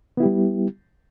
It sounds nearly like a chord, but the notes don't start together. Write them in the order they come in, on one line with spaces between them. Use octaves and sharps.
B3 E4 G4 G3